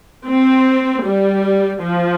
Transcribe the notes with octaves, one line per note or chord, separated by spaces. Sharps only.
C4
G3
F3